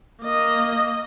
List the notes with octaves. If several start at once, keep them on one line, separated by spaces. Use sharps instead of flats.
A#3 D#5